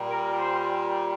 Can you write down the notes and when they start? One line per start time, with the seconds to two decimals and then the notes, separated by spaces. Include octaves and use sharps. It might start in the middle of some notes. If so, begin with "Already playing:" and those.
Already playing: A#2 G3
0.08 A#4
0.39 C5